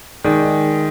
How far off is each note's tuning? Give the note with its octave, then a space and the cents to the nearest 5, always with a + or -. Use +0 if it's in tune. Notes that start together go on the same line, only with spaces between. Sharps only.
D#3 +0 G#3 +5 D5 +0